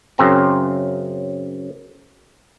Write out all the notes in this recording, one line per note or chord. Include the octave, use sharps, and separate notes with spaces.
F#2 C#3 C4 A#5